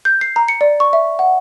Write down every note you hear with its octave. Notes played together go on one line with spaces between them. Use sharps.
G6
C7
A#5
C#7
D5
C#6
E5
F#5